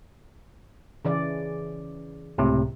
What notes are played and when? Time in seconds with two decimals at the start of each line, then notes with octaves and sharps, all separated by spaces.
1.05 C#3 E3 D5
2.38 C#2 A2 C3